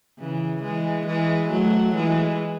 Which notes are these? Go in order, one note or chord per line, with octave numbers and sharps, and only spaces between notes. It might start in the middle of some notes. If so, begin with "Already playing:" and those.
C#3 E3
E3 G#3
E3 G#3
F#3 A3
E3 G#3